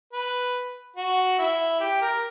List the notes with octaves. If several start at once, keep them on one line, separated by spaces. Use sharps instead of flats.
B4
F#4
E4
G4
A#4